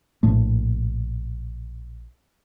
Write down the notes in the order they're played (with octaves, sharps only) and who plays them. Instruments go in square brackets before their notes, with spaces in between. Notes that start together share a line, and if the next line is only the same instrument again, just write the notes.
[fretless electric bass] A#1 A2 A3